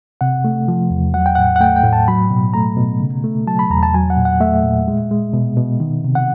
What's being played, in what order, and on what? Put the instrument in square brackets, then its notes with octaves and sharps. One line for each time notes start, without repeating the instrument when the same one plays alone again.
[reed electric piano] C3 F#5
A3
F3
E2
F#3 F#5
G5
A2 F#5
F#5
A3 G5
G5
A2
A5
F#3 B5
B2
A3 A#5
B2
C#3
A3
F#3 A5
B5
E2 A#5
A5
F#3 G#5
F#5
A#2
F#5
A3 E5
A#2
G#3
G#3
B2
B2
D#3
C3
F#5